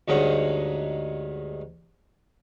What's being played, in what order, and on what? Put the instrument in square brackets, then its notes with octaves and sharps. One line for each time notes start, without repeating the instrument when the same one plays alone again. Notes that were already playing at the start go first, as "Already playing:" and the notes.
[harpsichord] D2 G2 G#3 D#4 C#5 F#5